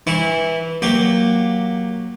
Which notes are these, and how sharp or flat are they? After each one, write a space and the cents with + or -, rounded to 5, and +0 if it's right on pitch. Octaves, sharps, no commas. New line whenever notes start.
E3 -10 E4 -20 C#6 +0
F#3 +0 A#3 +5 G4 +0